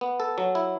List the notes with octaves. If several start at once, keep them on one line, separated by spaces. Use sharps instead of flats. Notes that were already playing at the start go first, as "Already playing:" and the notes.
B3
A4
F#3
E4